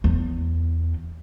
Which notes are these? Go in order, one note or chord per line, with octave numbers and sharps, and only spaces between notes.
E2